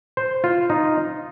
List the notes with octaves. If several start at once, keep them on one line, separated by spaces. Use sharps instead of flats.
C5
F4
D#4